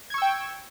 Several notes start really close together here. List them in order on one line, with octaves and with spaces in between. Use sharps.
G#6 C#6 E6 G5